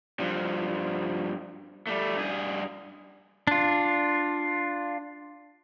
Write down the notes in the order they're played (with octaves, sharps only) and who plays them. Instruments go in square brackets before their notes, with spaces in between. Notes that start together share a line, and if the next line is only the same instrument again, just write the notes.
[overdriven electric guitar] G2 F3
G3 A3
G2 G#4
[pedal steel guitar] D4 F4